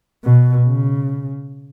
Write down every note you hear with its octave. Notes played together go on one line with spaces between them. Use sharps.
B2
C#3